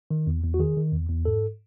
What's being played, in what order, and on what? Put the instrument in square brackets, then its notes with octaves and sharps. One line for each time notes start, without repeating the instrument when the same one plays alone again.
[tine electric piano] D#3
E2
E2
F#4
D#3 G#4
D#3
E2
E2
G#2 A4